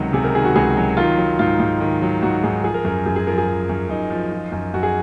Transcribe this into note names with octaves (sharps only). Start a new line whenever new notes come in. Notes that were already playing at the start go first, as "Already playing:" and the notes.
Already playing: C#2 C3 D#3 F#3 F#4
C3 G#4
A#4
D#3 G#4
F#4
C#2 G#4
F#3
D#3 F4
F#3
G#2 F4
G#2
D#3
F#3
G#2 F#4
G#2 G#4
F3 G#4
A#4
F#2 A#4
F#2 G#4
G#4
F3 A#4
G#4
F3
F#2
F#2 D#4
F3
F3
F#2
F#2 F#4
G#4